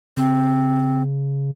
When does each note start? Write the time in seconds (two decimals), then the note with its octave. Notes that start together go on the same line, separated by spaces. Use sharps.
0.17 C#3 C4